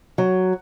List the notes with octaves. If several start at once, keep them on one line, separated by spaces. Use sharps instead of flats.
F#3